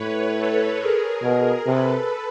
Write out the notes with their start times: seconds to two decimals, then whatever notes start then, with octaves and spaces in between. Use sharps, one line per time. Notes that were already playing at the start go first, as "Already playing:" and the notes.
Already playing: A2 B4 C#5
0.33 A4 B4
0.78 G#4 A#4
1.22 B2 G#4 A#4
1.65 C3 A4 B4